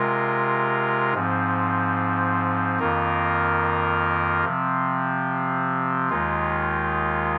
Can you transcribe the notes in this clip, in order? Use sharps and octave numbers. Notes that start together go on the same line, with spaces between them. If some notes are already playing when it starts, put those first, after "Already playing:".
Already playing: C3 G#3 F4 A#4
G#2 F3 C4
F2 D#3 A#3 F4 A#4
C3 F3 C4
D#2 D#3 G#3 F4